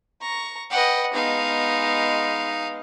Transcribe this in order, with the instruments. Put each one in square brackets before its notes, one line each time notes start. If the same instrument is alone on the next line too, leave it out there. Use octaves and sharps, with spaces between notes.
[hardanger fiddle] A#5 C#6
[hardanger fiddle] B4 G5 [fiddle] D#5 F#5
[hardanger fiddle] G#3 B3 [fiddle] D#4 F5